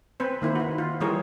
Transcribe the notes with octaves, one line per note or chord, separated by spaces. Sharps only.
C4 B4 C5
D#3 A#3 E4 C5
F#4 B4
F4
E3 G3 G#4 A#4 C#5